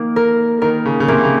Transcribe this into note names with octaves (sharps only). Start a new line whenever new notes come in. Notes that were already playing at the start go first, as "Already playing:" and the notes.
Already playing: D#3 A#3
A#4
D#3 A#4
C#3
C#3
C3 A#3
C#3